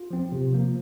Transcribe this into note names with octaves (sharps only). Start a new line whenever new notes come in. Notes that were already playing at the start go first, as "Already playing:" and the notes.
Already playing: F4
F3 C4
C3
F3 A#3